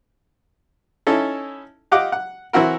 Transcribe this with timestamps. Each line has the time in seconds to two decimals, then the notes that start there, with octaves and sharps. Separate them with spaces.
1.07 C#4 D#4 E4 A4
1.91 F4 G4 D#5 F#5 D6
2.12 F#5
2.53 E3 C4 E4 F#4 A#4